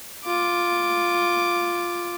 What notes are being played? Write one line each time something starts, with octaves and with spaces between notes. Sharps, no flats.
F4 D6